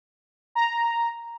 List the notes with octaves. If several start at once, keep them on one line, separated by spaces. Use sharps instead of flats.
A#5